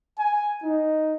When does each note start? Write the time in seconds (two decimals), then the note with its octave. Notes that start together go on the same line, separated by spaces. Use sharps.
0.18 G#5
0.63 D#4